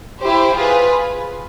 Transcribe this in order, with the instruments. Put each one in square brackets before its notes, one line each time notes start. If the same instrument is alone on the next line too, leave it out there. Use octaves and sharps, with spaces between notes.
[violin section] E4 G4 C5
F4 G#4 B4